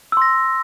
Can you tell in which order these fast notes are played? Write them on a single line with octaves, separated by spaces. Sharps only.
E6 C6 A#6